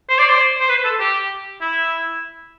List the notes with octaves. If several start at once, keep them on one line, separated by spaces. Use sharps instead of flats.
C5
D5
C5
C5
B4
A4
G4
E4